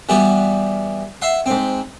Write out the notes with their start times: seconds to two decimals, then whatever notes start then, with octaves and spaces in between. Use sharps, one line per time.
0.09 E3 G3 B3 F#4
1.22 E5 F#5 C6
1.46 G#2 C4